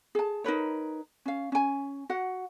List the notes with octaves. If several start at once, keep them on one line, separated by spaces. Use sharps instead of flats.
G#4 A5
D#4 A#4 B4 C#5
C#4 F5
C#4 G#5
F#4 F#5